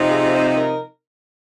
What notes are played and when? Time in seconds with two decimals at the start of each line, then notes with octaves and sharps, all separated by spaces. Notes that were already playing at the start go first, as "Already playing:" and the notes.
Already playing: C3 F3 C4 D#4
0.11 G#4
0.34 C5
0.57 A#4